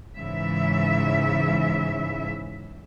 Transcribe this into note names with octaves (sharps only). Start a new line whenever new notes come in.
G#2 C#3 E3 E5